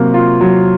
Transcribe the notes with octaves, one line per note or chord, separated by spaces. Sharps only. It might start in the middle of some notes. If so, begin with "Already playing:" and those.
Already playing: C3 F#3 A#3
F4
F#3